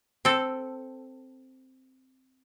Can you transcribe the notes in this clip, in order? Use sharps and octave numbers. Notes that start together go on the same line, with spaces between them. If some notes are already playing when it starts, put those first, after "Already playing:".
C4 A4